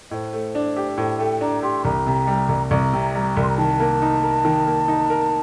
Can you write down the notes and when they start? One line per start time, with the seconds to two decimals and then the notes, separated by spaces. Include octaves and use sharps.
0.10 A2 C5 D#5
0.33 A3
0.55 D4
0.76 G4
0.98 A2 C5
1.19 A3 G5
1.41 D4 A#5
1.63 G4 C6
1.85 C2 A#5
2.06 C3
2.27 G3
2.49 C2
2.71 C2 A#5
2.93 C3
3.15 G3 A#5
3.37 C2
3.42 C6
3.49 A#5
3.58 D#3 A5
3.80 A#3
4.02 D#4
4.23 A#4
4.45 D#3
4.66 A#3
4.88 D#4
5.10 A#4